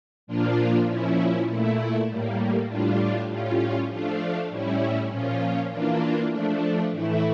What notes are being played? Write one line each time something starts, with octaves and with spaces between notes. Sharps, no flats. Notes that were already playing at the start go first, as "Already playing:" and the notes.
A#2 F3 A#3 D4 F4
A#2 F3 C#4 E4
A#2 A3 E4
A2 G3 A#3
A2 G3 D4 F4
A2 G3 C#4 F4
F3 A3 D4 F4
A2 G3 C#4 E4
A#2 F3 C#4 F4
E3 A#3 D4 F4
F3 A3 D4
A2 E3 A3 E4